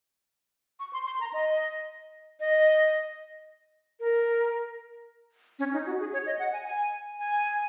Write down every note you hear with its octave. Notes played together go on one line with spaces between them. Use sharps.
C#6
C6
C6
A#5
D#5
D#5
A#4
C#4
D#4
F#4
G#4
C#5
D#5
F#5
G#5
G#5
G#5